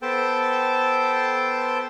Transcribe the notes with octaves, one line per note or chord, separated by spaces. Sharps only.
B3 A4 C5 G5 A5